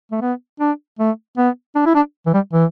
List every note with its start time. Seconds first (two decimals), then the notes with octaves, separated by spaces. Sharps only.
0.11 A3
0.21 B3
0.60 D4
0.99 A3
1.38 B3
1.75 D4
1.86 E4
1.95 D4
2.26 E3
2.34 G3
2.53 E3